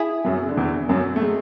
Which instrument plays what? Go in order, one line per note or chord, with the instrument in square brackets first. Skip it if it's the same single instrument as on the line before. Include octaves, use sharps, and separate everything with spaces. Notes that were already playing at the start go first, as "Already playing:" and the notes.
Already playing: [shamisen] E4 G#4
[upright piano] F#2 F#3
C#3
D3
E2 E3
F#2 F#3
A3
G#3